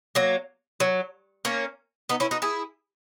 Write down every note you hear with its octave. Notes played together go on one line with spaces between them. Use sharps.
F#3 A#3
F#3
A#3 C#4
B3 D#4
C#4 E4
D#4 F#4
E4 G#4